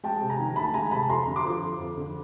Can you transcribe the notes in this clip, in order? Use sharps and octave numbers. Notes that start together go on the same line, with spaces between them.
G#3 G5 A5
C3
G#5 A#5
D#3
D2 A5 B5
G#3 G#5 A#5
C3 A5 B5
F2 A#5 C6
D3
C6 D6
F3
F2
F2
D3